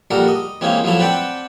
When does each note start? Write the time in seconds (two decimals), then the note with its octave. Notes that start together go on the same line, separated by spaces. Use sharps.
0.11 A#1 G3 F#4 A4 A#4
0.28 D#5
0.61 E3 G#3 A#3 C4 C#4 E4
0.84 F3 F#3 A3 E4 A5
0.99 C4 B4 D5 F#5 G5 A5